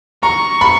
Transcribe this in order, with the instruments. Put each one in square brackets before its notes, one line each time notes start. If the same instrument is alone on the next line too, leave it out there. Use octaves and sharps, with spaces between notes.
[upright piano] A#5 [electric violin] C#6
[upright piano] B5